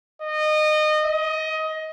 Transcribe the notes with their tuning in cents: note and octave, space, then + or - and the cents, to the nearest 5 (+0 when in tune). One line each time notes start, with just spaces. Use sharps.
D#5 -25
D#5 +20